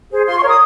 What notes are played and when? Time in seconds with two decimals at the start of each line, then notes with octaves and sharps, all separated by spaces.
0.10 G#4 C5
0.26 F4 C6
0.37 C#6
0.42 A#4 C#5
0.48 D#6